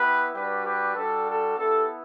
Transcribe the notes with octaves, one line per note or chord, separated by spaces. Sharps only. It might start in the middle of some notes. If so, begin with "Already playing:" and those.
Already playing: B3 E4 G4 B4
G3 D4 F#4 G4 B4
G4 B4
G3 D4 F#4 A4
A4
B3 E4 G4 A4